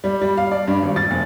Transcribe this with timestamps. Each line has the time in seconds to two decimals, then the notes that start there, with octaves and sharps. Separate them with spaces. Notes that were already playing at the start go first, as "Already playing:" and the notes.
0.04 G3
0.21 G3
0.37 F5
0.51 D5
0.68 G2
0.83 G#1
0.96 A6
1.11 F1